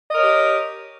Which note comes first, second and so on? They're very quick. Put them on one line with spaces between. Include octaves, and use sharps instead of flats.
D#5 A#4 C#5 G4